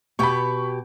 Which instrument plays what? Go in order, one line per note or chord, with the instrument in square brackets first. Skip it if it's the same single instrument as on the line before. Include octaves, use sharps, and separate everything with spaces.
[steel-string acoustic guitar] B2 G4 G5 [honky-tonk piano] B5 C#6